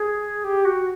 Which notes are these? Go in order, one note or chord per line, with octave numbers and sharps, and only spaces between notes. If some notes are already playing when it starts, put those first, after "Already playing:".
Already playing: G#4
G4
F#4